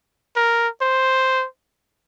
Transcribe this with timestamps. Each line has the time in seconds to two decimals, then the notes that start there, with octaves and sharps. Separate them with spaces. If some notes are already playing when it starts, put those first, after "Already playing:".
0.36 A#4
0.81 C5